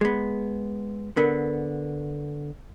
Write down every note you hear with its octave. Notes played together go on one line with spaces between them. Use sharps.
G#3 B3 G#4
D3 B3 A#4